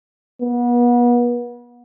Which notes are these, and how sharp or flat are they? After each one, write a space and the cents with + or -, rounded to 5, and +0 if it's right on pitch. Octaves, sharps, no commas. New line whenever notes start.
B3 -35